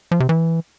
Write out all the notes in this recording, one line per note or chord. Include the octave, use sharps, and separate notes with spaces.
F3
C3
E3